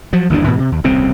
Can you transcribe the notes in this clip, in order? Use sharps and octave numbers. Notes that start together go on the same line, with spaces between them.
F3 F#3
G1 D#2 E3 D4
G#2 B2 E3
C3
D#2
D#1 C2 C#3 C4